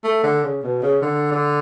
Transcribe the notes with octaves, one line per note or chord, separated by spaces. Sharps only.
A3
D3
C#3
B2
C#3
D3
D3